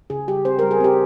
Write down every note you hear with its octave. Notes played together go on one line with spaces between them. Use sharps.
C#3 G#4
G3 G4
C4 C5
G3 A#4
G#4
C4 G4